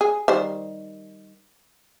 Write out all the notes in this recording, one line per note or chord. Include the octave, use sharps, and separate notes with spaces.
G#4
D#3 G3 C5